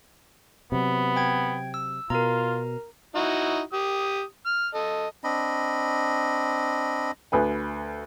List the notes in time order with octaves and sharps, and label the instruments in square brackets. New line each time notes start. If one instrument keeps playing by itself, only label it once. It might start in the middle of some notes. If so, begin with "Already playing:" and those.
[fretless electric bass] C3 F#3 [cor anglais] B3
[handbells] G5 G#6
E6
[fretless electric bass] B2 [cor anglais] F4 [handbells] A#4 A#5
[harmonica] D#4 E4 F#4
G4 D#6
F6
A4 D#5
[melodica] C4 D4 D#5 B5
[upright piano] D2 B4 G#5